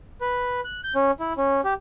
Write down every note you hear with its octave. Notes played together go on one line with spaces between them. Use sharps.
B4
F#6
G6
C#4
E4
C#4
G4